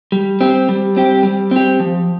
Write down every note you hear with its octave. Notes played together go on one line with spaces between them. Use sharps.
G3
C4 G4
G3
C4 G4
G3
C4 G4
F3